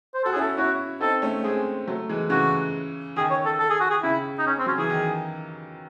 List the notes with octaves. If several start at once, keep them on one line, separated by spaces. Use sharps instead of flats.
C5
F#4 A4
C#4 E4 G#4
A4
C#4 E4 F#4
C4 D#4 A4
A3 C#4
G#3 C4 G#4
F#3 A3
E3 G#3
C#3 E3 F#4
D#3 G#4
C#5
A4
A4
G#4
F#4
G#4
C#3 E4
D#4
C#4
C4
F#3 C#4
E3 G#4
D#3